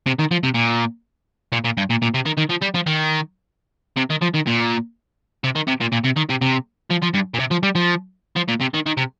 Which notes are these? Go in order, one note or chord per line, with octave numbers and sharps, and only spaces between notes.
C3
D#3
F3
C3
A#2
A#2
A#2
G2
A#2
A#2
C3
D#3
D#3
F3
G3
F3
D#3
C3
D#3
F3
D#3
A#2
C3
D#3
C3
A#2
A#2
C3
D#3
C3
C3
F3
F3
G2
A#2
C3
F3
G3
F3
F3
A#2
C3
D#3
D#3
C3